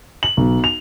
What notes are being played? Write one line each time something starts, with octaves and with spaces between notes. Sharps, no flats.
F#7
B1
F7